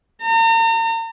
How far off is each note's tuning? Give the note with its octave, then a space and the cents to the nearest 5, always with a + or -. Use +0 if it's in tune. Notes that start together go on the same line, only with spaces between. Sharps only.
A#5 -40